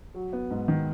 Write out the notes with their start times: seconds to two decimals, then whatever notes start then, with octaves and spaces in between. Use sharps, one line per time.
0.14 F#3
0.33 B3
0.51 G#2
0.68 D#3